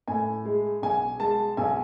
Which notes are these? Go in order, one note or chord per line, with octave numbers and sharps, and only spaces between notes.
A2 G#5
G#3
B1 G#5
G#3 A5
B1 G#5